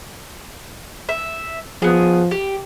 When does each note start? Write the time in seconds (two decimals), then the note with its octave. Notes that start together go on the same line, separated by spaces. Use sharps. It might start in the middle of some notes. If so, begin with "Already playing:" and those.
1.09 E5
1.82 F3 B3 G#4
2.31 G4